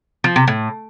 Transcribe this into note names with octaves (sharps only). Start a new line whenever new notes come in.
F3
C3
A2